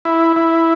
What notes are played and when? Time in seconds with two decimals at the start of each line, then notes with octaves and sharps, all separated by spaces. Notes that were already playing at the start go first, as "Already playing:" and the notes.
0.05 E4
0.36 E4